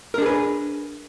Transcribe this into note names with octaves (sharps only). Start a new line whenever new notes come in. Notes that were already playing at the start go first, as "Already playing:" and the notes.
D4 G#4 A#4 B4